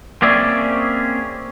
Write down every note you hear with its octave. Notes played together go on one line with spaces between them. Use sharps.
A#3 C4 C#4 G#4 D5 E5